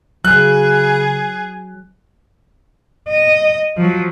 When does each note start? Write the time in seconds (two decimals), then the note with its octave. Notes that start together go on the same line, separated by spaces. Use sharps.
0.25 C#3 F#3 G#4 F#6
3.09 D#5
3.77 F3 F#3